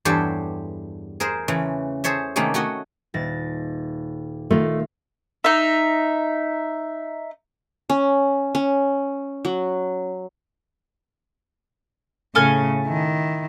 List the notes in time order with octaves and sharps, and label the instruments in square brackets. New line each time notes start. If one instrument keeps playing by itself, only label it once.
[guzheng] E2 G2 G4 A4 C5 C#5
G#4 A#4 C5 E5
C#3 E3 A3
G#4 A4 C5 C#5 E5
C3 D#3 A3 A#3 C#4 G#4
A3 F#4 C#5 D#5
[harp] D#1 A6 A#6
[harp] D#3 D#4 F4 [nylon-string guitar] A3
[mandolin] D#4 E5
[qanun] C#4
C#4
F#3
[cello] A2 C#3 [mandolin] A4 G#5 F6
[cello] D#3 E4